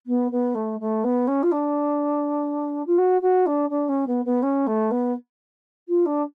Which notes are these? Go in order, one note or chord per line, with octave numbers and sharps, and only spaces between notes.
B3
B3
A3
A3
B3
C#4
F4
D4
F4
F#4
F#4
D4
D4
C#4
B3
B3
C#4
A3
B3
F4
D4